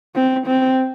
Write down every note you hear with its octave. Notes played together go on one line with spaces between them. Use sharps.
C4
C4